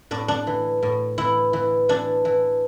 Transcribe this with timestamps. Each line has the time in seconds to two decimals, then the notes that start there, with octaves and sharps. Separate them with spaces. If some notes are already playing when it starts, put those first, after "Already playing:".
0.11 A2 D4
0.28 D4
0.47 E3
0.83 A2
1.18 E3 E4
1.53 E3
1.89 E3 D4
2.25 E3